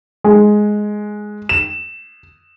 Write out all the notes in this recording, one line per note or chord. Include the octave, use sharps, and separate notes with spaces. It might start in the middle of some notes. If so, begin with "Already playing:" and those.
G#3
E7